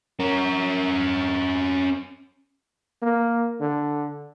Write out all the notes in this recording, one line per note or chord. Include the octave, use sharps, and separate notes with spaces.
C#4 A#4
A#3
D3